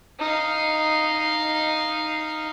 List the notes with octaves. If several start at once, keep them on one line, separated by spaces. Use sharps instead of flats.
D#4 F5